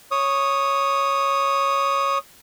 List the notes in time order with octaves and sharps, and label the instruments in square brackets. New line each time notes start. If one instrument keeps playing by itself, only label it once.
[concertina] C#5 D#6